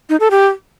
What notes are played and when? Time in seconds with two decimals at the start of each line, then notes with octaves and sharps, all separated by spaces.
0.09 D#4
0.20 A4
0.31 G4